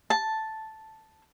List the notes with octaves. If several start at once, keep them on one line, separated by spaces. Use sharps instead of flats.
A5